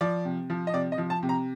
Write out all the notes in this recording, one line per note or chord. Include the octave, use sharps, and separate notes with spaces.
F3 D5
C3
F3
D#5
C3 D5
D#5
F3
A5
C3
A#5